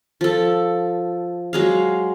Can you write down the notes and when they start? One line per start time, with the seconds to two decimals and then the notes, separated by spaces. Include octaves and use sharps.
0.21 F3 A4
1.53 F#3 G#3 F5